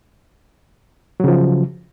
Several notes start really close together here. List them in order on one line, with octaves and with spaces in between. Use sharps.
F#3 C#3 F3